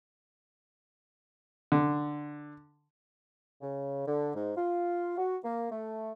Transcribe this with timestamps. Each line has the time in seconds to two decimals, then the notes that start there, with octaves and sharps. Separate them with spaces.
1.72 D3
3.62 C#3
4.07 D3
4.35 G#2
4.57 F4
5.18 F#4
5.44 A#3
5.71 A3